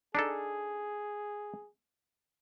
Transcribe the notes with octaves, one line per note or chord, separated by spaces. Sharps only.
D4 D#4 G#4 A4